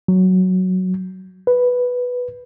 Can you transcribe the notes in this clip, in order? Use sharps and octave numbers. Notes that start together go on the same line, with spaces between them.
F#3
B4